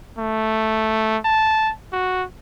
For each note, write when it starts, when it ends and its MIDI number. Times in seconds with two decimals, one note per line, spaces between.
0.19 1.17 57
1.25 1.71 81
1.93 2.23 66